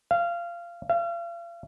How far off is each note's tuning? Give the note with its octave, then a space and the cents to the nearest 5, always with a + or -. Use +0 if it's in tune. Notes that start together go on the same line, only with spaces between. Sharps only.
F5 -20
F5 -40